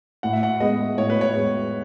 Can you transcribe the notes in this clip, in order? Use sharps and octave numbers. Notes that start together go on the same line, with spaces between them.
A2 F#5
E5
F#5
G#3 B3 D#5
A2 C#5
B4
C#5
G#3 B3